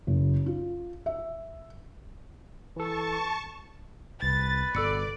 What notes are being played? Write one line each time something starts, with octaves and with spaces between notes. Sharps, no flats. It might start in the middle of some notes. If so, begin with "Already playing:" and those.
F#1
F4
E5
E3 A4 A5 C#6
C2 B4 A6
G1 B2 A4 D5 E6 C#7